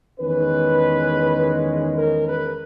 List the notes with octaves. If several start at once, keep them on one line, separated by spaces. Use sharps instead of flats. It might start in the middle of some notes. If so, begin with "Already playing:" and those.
E2 D#3 G#3 C#4 B4
A#4
B4